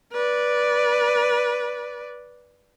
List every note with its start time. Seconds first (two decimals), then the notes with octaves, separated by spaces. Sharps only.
0.13 B4 D5